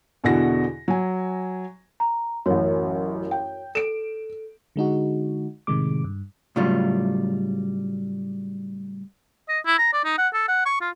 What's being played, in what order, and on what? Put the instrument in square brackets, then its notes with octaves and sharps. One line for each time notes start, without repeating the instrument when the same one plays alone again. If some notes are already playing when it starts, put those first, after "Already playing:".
[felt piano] E2 B2 D3 E4 F#4 A#6
F#3 G#5
[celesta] A#5
[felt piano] A1 F#2 [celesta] F#4 C#5
[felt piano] G5
[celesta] A4 [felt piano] D7 E7
[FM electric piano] D3 G#3 D#4 F#4
A2 C3 D#3 G#3 D6
G2
[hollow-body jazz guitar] A2 C#3 F#3 G3 F4
[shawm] D#5
E4
A#5
D5
D#4
F#5
A4
F#5
C#6
F4